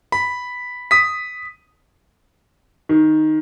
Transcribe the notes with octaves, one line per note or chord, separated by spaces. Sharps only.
B5
D#6 B6
D#3